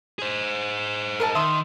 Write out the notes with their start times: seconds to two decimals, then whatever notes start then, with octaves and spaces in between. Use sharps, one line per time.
0.19 G#4 C5
1.20 A#4 D#5 A5
1.35 D#3 E5 C6 D#6